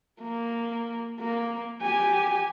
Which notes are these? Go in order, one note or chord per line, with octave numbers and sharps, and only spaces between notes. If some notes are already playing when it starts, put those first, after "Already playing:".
A#3
A#3
G4 G#5